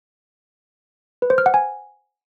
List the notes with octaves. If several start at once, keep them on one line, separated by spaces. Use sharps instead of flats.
B4
C5
F6
F#5
G#5